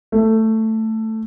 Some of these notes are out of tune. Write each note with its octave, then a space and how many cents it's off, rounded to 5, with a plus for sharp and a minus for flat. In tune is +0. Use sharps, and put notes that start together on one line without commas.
A3 +10